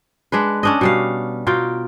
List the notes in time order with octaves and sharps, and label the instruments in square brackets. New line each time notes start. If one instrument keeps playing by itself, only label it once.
[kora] G#3 D4 B4
C#4 D4 D#5
B2 G3 F5
B2 F4 A#4 G5